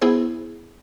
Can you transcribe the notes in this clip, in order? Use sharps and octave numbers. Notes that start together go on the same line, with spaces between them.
B3 E4 G#4 C5